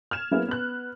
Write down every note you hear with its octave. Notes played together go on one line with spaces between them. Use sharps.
F6 G#6 E7
F#3 A#3 B3 E4 G#4
B3 F#6